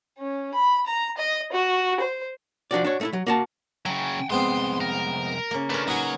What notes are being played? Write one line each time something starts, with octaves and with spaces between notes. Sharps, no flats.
C#4
B5
A#5
D#5
F#4
C5
F3 D4 F#4 D5
D4 F#4 C#5
A3 D#4 E4
F#3
A#3 F#4 A5
C#3 F#3 F#5 G5 A#5
C2 F2 G#3 B3 C4 C6
A#4
C#3 A#3
A3 C#4 D4 A#4 B4
F#3 A#3 D#4 F#4 G#5